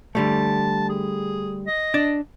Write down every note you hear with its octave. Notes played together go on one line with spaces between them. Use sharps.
D3 G3 A3 A5
G#4
D#5
D4 D5